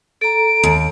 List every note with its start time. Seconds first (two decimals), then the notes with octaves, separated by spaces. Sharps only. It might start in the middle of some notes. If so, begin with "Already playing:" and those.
0.21 A4 A#5 D7
0.63 D#2